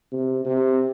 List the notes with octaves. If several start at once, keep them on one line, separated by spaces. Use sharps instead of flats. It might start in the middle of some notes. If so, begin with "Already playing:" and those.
C3
C3